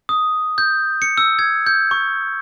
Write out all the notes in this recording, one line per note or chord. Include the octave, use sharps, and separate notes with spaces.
D#6
G6
C#7
E6
G#6
G6
C#6